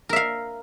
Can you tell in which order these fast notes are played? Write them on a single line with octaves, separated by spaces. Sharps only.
A#4 E5 F5